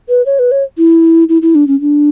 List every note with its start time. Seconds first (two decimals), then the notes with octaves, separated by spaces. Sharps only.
0.09 B4
0.26 C#5
0.39 B4
0.52 C#5
0.78 E4
1.29 E4
1.42 E4
1.55 D4
1.67 C#4
1.81 D4